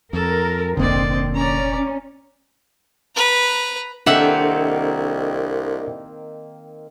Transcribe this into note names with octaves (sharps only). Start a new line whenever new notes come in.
F2 A4 A#4
F1 A#1 D3 A#3 C4 D5 D#5
C#4 D5 A#5
B4 A#5
C2 D#3 A#3 C4 D4 A4 E5 F#5